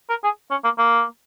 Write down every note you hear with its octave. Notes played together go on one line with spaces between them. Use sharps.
A#4
G#4
C#4
A#3
A#3